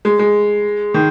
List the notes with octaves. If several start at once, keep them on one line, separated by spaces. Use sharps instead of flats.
G#3
G#3
D#3